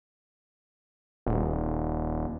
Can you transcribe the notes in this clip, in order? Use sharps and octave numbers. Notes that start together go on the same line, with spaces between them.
D#1